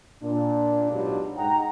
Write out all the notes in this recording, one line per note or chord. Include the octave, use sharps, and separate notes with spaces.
A#2 D4
G#2 B2 F#3 D4 F4 G4
G#2 D#4 F#5 G5 A#5